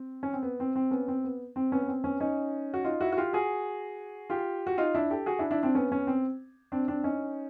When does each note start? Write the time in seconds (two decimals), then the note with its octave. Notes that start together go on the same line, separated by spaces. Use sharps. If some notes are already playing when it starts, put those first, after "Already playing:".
Already playing: C4
0.23 C#4
0.33 C4
0.43 B3
0.60 C4
0.76 C4
0.91 B3 C#4
1.08 C4
1.24 B3
1.56 C4
1.72 B3 C#4
1.82 B3
1.88 C4
2.04 B3 C#4
2.20 C#4 D#4
2.74 F#4
2.85 D#4 F4
3.01 E4 F#4
3.12 F#4
3.17 F4 G4
3.33 F#4 G#4
4.30 F4 G4
4.67 F#4
4.78 D#4 F4
4.95 D4 E4
5.10 G4 A4
5.26 F#4 G#4
5.39 D4 E4
5.51 D4 E4
5.63 C4 D4
5.75 B3 C#4
5.91 B3 C#4
6.07 C4
6.72 C4 D4
6.88 C4 D4
7.04 C#4 D#4